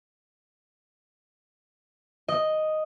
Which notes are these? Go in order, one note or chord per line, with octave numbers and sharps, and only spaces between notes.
D#5